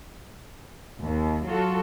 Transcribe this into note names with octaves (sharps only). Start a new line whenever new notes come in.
D#2
F#3 F4 F#4 A4